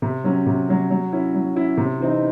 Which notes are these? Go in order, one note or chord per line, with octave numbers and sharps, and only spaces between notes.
C3
F#3 C#4
C3
F#3 C#4
F#3
C#4 E4
F#3
C#4 E4
C3
E3 C4 D#4